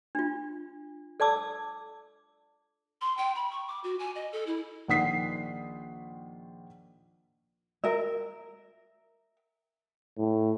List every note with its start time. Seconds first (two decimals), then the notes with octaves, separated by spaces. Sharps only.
0.15 D4 F4
1.20 A4 D5 A5 D6 E6
3.01 C6
3.17 G5
3.35 B5
3.51 C#6
3.68 D6
3.84 F#4
3.99 G#5
4.15 D#5
4.32 A4
4.47 E4
4.88 A#1 D#3 F#5 D#6 B6 C7
7.84 A#4 E5
10.18 A2